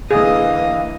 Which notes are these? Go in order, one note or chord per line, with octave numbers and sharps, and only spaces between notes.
D3 E3 A#3 G#4 D#5 F5